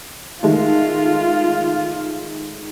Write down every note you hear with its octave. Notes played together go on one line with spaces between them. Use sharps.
D#3 G#3 A3 F4